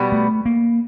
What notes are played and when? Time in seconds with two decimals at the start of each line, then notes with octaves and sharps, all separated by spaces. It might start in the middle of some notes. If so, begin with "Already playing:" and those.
Already playing: B2 G3 B3
0.12 A3
0.46 A#3